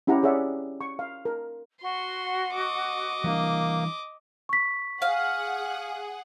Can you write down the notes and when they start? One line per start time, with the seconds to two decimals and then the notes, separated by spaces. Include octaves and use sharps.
0.07 C#4 E4 G4 F#5 A#5
0.23 G#4 C#5 D5 E5 F#5
0.81 C#6
0.99 F5
1.25 A#4
1.82 F#4 C6
2.54 D#5 D6
3.24 E3 G3 A#3 D4
4.49 C#6 B6
5.02 G#4 F5 F#5